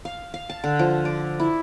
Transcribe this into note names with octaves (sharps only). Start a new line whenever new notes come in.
F5
F5
A5
D3
F3
D5
E4